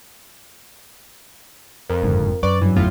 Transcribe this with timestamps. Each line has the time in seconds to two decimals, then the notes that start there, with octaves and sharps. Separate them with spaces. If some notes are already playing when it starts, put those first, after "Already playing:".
1.90 F2 A#4
2.03 F#1 G#2 D3
2.43 F#2 B4 D5 C#6
2.62 G2 E3 F#3
2.76 G1 F2 A2 B3 F4